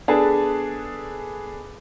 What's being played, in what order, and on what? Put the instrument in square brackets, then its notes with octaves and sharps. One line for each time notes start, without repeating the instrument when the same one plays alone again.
[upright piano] B3 D4 G#4 A4 B4 A5